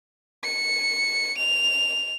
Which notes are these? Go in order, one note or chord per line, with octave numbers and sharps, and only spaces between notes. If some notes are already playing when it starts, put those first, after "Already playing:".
C#7
F7